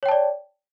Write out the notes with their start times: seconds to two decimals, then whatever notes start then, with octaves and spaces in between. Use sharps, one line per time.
0.03 C#5
0.06 G5
0.09 A5
0.11 D5